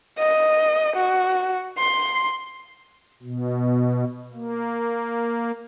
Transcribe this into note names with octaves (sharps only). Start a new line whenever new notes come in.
D#5
F#4
C6
B2
A#3